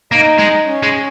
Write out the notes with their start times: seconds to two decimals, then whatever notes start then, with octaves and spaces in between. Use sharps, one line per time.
0.12 A#3 D#4
0.38 G#3
0.66 C#4
0.83 G#3